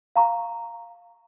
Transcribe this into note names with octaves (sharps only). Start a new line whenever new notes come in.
F5 A#5 C#6